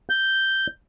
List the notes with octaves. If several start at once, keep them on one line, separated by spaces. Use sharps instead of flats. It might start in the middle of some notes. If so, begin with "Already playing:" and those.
G6